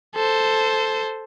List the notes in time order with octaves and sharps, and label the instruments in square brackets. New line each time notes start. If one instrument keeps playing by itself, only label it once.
[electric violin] A4 C5